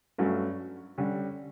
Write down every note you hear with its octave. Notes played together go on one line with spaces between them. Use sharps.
G2 F#3 A3 C#4 F#4
D3 G3 C#4